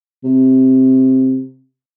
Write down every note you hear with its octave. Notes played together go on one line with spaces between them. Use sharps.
C3